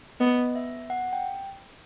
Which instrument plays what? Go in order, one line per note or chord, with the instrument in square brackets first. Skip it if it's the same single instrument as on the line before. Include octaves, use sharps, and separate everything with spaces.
[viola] B3 [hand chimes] D#5
[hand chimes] E5
F#5
G5